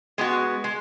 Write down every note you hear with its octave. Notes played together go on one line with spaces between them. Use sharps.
G#3 B3 F#4
G#3